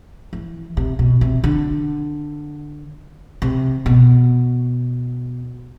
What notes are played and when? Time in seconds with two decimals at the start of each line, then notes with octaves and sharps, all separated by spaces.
0.33 E3
0.77 C3
0.99 B2
1.21 C3
1.44 D3
3.42 C3
3.86 B2